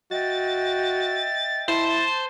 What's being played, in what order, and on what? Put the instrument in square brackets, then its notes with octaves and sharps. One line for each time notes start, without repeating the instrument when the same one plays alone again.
[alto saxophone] F#4 [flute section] D#5 E5 G5 [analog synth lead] A6
[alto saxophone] E4 [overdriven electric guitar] C5 [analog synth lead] A5